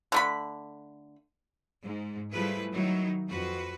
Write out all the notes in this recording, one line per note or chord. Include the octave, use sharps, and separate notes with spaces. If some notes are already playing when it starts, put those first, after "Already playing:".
D3 A3 B5
G#2
F3 G3 A3 E4 G#4 B4
D#3 F#3 D#4 E4
F2 F#4 B4